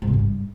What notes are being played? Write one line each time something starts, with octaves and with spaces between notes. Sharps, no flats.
G#2
C3
G#2
G2